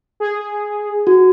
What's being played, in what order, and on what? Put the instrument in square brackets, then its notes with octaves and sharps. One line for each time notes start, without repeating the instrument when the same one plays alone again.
[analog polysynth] G#4
[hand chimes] F#4